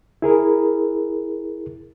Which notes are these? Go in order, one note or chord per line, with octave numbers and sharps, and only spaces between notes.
E4 G#4 A#4